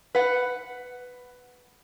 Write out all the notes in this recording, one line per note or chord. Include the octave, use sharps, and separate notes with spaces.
B4 F#5